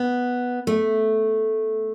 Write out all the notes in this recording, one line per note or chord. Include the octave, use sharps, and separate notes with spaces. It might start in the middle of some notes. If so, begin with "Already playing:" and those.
Already playing: B3
A3